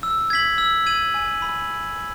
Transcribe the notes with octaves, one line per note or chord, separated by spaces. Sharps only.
E6
G#6 B6 F#7
E6
G#6 D#7 F#7
G#5
B5